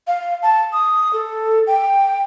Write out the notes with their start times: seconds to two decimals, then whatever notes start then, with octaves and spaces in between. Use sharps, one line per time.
0.07 F5
0.43 A5
0.73 D#6
1.13 A4
1.67 G5